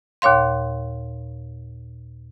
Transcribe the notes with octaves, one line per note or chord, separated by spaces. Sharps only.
D#2 A#2 C#5 F5 C6